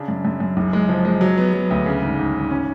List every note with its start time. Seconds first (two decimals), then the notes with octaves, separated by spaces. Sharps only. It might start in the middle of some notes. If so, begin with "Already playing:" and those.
Already playing: C#3 D4
0.08 F#2
0.25 F#2
0.40 F#2
0.57 F#1
0.73 G#3
0.89 F3
1.05 G#3
1.21 F#3
1.38 B3
1.53 F#3
1.70 D2
1.86 C#3
2.02 G#1
2.19 G#1
2.35 G#1
2.50 C#4